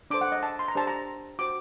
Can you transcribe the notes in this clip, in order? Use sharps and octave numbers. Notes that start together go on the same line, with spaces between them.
D4 A4 C5 D6
F#5
D#5
A5
C6
A#5
D4 G4 C5 A5
A#5
F#4 C5 D6